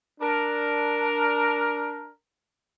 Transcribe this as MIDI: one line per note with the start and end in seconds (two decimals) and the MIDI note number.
0.21 2.12 62
0.21 2.12 70